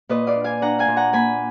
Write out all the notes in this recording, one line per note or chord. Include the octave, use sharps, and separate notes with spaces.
A#2 B4 D#5
D5 F5
D4
F5 G#5
D4 F#5 A#5
F5 G#5
A#2
F#5 A#5
A#3 G#5 B5